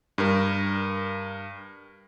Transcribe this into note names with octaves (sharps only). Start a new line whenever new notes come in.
G2 A#4